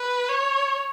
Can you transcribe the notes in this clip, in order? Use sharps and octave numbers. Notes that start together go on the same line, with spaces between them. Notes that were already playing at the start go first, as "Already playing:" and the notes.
Already playing: B4
C#5